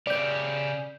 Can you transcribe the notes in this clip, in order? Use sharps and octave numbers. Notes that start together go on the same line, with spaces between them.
C#3 G4 D5 G6